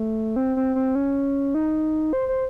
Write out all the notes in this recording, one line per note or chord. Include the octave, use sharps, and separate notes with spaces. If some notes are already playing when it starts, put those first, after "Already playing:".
Already playing: A3
C4
C4
C4
C#4
D#4
C5
C5